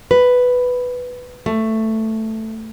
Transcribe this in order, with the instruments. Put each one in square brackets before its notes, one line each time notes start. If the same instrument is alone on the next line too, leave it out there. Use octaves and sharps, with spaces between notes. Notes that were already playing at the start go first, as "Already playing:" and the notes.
[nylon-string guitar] B4
A3